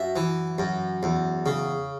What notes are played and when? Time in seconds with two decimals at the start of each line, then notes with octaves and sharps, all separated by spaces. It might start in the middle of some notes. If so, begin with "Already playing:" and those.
Already playing: F#2 E5
0.16 E3
0.58 F#2
1.03 E2
1.46 C#3